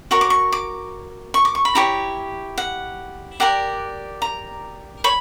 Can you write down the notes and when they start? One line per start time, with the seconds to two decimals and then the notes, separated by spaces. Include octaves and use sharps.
0.11 F#4 A#4 C#5 C#6
0.21 D6
0.30 C#6
0.52 D6
1.34 C#6
1.45 D6
1.55 C#6
1.65 B5
1.75 E4 G4 C#5 A#5
2.58 F#5
3.40 G4 A#4 D5 F#5
4.22 A#5
5.04 C#5 B5